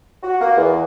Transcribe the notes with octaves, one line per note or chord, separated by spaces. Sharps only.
F#4
A#3
E2